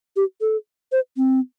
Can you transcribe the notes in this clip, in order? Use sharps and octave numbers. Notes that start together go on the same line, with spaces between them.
G4
A4
C5
C4